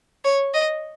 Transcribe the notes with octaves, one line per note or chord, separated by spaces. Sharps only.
C#5
D#5